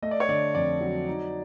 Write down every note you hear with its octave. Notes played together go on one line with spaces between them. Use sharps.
A3 D#5
D5
C#5
D3 D5
F2 D5
F#3
D#4